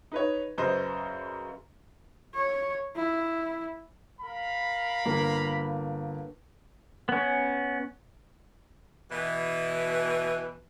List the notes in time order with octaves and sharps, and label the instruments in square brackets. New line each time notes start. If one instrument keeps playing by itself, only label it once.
[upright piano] D#4 B4 C#5
F#2 C#3 B4 C5 D#5
[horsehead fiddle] C#5
E4
[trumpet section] A#4 F5 B5
[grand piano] G1 A#3
[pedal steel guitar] B3 C#4
[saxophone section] B2 E3